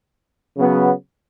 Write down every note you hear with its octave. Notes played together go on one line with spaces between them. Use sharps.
C#3 F#3 B3